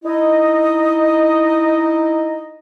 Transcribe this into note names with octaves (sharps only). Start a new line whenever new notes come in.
D#4 E4 D#5